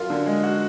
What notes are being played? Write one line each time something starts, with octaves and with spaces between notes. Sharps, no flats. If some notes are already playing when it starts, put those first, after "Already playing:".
Already playing: F#2 F4
D3
G#3
F#4